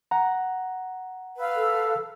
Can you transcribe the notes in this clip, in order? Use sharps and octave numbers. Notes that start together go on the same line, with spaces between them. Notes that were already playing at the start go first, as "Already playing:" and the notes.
F#5 A#5
B4 F5 E6
A4